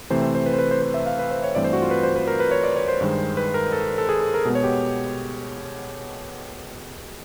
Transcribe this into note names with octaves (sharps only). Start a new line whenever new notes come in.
C3 E3 A3 C4 C5
C5
C5
B4
C5
B4
C5
C5
E5
F5
B4
C5
C#5
G2 E3 A3 C4 D5
C5
F#4
F4
B4
C5
B4
A#4
B4
C#5
D5
C#5
C5
G2 D#3 G#3
B4
A#4
A4
A4
G#4
A4
A#4
B2 G#3 B3
C#5
G4